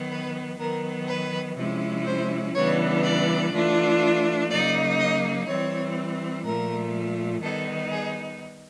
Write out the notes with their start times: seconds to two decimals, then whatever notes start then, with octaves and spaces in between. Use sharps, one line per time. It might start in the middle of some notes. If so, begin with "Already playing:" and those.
Already playing: D#3 F#3 B3
0.11 B4
0.59 D#3 F#3 B3 A#4
1.08 B4
1.57 C3 F3 G#3 C#4 E4
2.06 C5
2.54 C#3 E3 G3 B3 D4 C#5
3.03 D5
3.52 E3 A3 D4 F4
4.49 C#3 F#3 A#3 D#4 D5
4.99 D#5
5.47 E3 G3 C4 C#5
6.44 A#2 F3 A3 A#4
7.42 D#3 G3 B3 D#4 A4
7.91 G#4